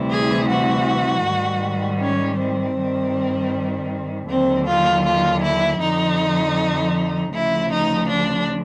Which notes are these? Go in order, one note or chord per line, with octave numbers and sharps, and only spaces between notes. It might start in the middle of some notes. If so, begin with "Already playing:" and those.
Already playing: D2 C3 E3 G3
G#4
F#4
G#2 D#3 G3
C#4
C4
G2 D#3 G3
D#2 D3 F#3 C4
F4
F4
E4
F2 D3 F3 D#4
D2 C#3 F3 E4
D#4
D4